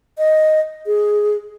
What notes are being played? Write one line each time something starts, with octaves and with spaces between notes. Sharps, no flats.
D#5
G#4